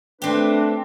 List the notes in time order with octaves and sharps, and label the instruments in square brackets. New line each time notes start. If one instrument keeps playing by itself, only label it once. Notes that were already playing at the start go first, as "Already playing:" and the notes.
[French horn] A3 [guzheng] C4 G4 [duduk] D4 [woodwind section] B4